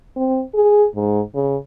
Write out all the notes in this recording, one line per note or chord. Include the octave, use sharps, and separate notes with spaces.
C4
G#4
G#2
C#3